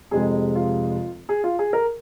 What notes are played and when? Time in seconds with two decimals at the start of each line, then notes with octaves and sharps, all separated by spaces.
0.11 F1 F2 C3 F3 G#3 G#4
0.55 F4
1.29 G#4
1.44 F4
1.59 G#4
1.73 A#4